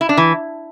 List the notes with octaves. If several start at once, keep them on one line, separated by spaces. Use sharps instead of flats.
E4
D4
E3